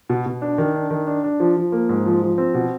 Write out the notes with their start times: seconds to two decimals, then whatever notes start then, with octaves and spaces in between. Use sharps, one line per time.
0.09 B2
0.26 B2
0.42 D4
0.58 D#3
0.74 D4
0.91 D#3
1.07 D4
1.24 D4
1.40 F3
1.57 F3
1.72 A#3
1.89 G#2
2.06 F3
2.22 F3
2.38 C4
2.54 B2